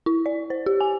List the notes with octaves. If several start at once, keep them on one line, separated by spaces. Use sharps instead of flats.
E4
D5
C5
G4
G#5